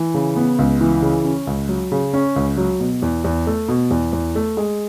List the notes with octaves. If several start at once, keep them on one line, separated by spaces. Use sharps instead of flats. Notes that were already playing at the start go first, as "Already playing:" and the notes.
Already playing: E3
C#3
B3
C#2
E3
C#3
C#4
C#2
F#3
C#3
C#4
C#2
F#3
B2
E2
E2
A3
B2
E2
E2
A3
G#3